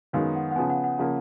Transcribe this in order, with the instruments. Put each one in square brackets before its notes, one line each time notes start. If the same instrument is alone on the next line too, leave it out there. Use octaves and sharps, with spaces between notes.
[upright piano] F#2 D#3 G#3 B3 [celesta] F5
[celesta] F#5
F#5
[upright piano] C#3 F3 B3 [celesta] G#5
[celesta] F#5
F#5
[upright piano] C#3 F3 A#3